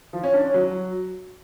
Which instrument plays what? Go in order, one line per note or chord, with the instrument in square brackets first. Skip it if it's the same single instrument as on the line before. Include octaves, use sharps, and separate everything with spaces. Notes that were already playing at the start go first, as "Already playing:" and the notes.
[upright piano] F3
C#4
D4
C#4
F#3